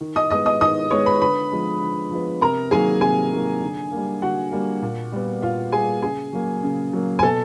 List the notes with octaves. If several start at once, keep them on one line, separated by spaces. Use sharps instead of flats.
D#3
D#5 D#6
G#3 B3 D#5 D#6
D#5 D#6
D#3 D#5 D#6
G#3 B3 C#5 C#6
B4 B5
D3 B4 B5
F3 G#3 B3
D3
F3 G#3 B3
C3 A#4 A#5
D#3 F#3 A#3 G#4 G#5
C3 G#4 G#5
D#3 F#3 A#3
D3
G3 A#3
D3 F#4 F#5
G3 A#3
A#2
G3 B3
A#2 F4 F5
G3 B3 G#4 G#5
C#3 G#4 G#5
F#3 A#3
C#3
F#3 A#3
G#5
B2 A4 A5